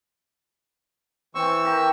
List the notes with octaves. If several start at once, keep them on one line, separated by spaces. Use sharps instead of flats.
E3 C4 C#6 E6
G4 A#4 G5